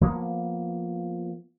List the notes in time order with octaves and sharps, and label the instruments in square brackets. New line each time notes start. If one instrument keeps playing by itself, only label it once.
[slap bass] F3 A#3 B3